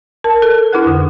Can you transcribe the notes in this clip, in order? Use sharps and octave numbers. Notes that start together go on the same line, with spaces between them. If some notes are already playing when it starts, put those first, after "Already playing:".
A#4 A5
A4 A#4
D4 E4 G#4 B4 F#5 F#6
F2 D3